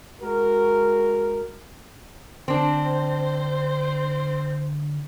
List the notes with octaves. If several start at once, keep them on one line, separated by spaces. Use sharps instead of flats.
G#3 F#4 A#4
D3 C4 D4 C5